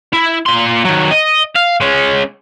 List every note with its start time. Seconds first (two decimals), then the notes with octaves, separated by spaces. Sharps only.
0.13 E4
0.46 A#2 C6
0.84 D#3 F#3
1.11 D#5
1.55 F5
1.80 G#3 C#4